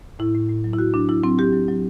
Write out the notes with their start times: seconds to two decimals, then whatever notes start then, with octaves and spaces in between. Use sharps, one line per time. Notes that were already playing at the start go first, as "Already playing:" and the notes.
0.19 A2 E4
0.35 A2
0.49 A2
0.64 F#3
0.73 E4
0.78 A2 F#4
0.94 F#3 D4
1.08 F#3 E4
1.23 F#3 C4
1.38 F#3 G4
1.52 F#3
1.68 F#3